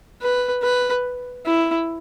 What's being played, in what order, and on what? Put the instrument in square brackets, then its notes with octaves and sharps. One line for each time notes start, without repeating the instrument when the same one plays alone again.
[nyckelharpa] B4
B4
E4